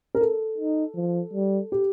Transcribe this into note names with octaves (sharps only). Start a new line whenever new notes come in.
A#4
A4
D#4
F3
G3
G4